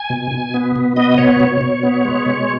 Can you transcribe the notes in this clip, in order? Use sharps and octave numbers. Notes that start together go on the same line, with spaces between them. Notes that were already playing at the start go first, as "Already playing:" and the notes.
Already playing: G#5
B2
B2
B3
B2
B3 D#5
B2 C#5
B2
B2
B3
G#3
B2